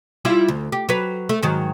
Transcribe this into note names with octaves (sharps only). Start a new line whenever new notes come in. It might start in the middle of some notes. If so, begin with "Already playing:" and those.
G3 E4 F4
D2
G4
F#3 B4
A3
G#2 D#3 F#3